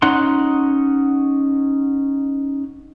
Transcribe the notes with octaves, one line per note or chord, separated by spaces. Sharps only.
C#4 D#4 F#5 C6